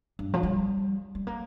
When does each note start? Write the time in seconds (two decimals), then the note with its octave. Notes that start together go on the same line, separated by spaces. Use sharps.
0.19 G2
0.34 F3
0.43 G3
1.15 G3
1.27 A#3